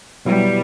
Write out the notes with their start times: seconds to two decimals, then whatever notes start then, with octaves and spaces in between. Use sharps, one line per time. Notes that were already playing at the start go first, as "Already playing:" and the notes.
0.25 B2 F#3 G3 B3 E4 B4